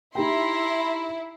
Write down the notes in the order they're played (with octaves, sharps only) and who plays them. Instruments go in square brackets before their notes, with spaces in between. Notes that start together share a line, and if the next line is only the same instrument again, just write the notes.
[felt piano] D#4 G4 G5 [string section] E4 [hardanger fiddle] A#5 C6